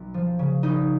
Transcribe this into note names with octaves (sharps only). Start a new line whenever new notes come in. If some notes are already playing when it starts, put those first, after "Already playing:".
Already playing: B1
F3
C#3
A#1 D#4